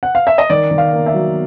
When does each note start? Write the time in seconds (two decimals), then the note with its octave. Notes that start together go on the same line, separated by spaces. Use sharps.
0.03 F#5
0.15 F5
0.27 E5
0.38 D#5
0.50 D#3 D5
0.71 D#3
0.78 F5
0.93 A#3
1.06 E5
1.14 F#3